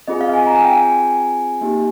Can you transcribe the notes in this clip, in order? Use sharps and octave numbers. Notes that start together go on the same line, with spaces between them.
C4 F4 G#4 D#5
F5
G#5
A#5
G#5
G5
G#5
A#3 D#4 G4